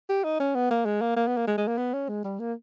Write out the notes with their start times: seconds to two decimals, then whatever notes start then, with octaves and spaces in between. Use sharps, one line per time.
0.09 G4
0.24 D#4
0.40 C#4
0.55 B3
0.70 A#3
0.86 G#3
1.02 A#3
1.16 A#3
1.27 B3
1.37 A#3
1.47 G#3
1.57 G#3
1.67 A#3
1.78 B3
1.93 C#4
2.09 G#3
2.24 G3
2.39 A#3